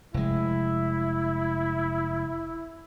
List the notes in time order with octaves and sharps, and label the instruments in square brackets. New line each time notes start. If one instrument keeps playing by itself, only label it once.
[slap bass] F1 G#3 [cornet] E4